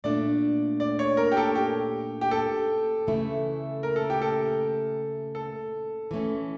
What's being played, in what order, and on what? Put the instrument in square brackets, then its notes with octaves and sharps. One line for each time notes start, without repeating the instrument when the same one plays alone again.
[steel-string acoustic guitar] A#2 A3 D4 [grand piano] D5
[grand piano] D5
C#5
A#4
G4
A4
G4
G4
A4
[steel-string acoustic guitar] C#3 E3 A3 E4
[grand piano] A#4
A4
G4
A4
A4
[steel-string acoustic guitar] E3 A3 C#4